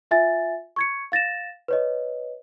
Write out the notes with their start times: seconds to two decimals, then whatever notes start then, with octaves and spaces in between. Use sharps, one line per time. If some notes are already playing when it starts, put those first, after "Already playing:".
0.11 F4 E5 G#5 A6
0.76 C#6 G#6 C#7
1.12 F5 A6 A#6 E7
1.68 B4 C#5 D#5